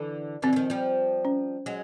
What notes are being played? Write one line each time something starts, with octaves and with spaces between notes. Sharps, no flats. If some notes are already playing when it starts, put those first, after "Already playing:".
Already playing: D3 E3
D3 E3 C4
F#3
D#3 F3
F3 G3
C#4
F#3 G#3